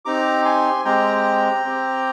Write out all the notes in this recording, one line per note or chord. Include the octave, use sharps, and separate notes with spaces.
C4 D#4 G4 A#5 D6
G#5 C6
G#3 C4 G4 G5 A#5
C4 G4